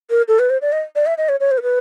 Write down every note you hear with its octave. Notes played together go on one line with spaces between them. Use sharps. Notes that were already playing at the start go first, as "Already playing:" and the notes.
A#4
A4
B4
C5
D5
D#5
D5
E5
D#5
C#5
C#5
C5
A#4
B4